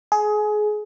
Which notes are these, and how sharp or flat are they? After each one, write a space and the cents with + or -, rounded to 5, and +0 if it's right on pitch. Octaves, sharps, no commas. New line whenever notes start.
G#4 +25